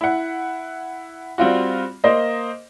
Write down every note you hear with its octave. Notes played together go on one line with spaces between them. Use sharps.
E4 F#5
G3 C4 F4 F#4
A#3 C5 D#5